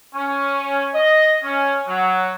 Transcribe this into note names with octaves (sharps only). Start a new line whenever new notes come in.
C#4
D#5
C#4
F#3